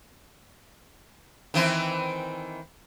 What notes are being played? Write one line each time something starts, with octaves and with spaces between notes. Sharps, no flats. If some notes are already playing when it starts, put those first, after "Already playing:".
D#3 E3 C4